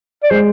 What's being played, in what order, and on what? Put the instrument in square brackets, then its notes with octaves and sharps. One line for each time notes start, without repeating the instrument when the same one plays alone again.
[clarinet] D5
[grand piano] G#3 [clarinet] C5